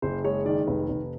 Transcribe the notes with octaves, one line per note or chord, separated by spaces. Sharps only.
F#1 C5
G#3 C#5
D#3 D5
F1 B4
F1